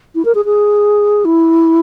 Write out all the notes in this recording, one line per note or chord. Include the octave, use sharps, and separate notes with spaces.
E4
A#4
G#4
G#4
E4